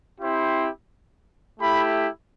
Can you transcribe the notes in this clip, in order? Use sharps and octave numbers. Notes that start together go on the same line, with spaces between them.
C4 E4 G4 C5
A3 E4 G4 B5